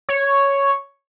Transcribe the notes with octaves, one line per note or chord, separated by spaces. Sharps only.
C#5